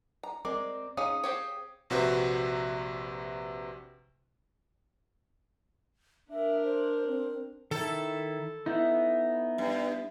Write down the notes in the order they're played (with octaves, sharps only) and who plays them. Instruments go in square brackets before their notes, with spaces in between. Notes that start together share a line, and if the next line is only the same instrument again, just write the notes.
[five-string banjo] A#5
[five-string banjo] G#3 [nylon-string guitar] C4 A#4 D5 [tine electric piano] D6
[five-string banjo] C#4 D#4 [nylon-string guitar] G#4 F5 [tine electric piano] D#6
[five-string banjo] C4 G4 C#5
[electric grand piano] A#1 C3 F#4 B4 C5 E5
[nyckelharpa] D4 A#4 [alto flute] E5
[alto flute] C5
C4
[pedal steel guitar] D#3 E4 [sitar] A4
[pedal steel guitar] B3 D#4 [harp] E4
[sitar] G2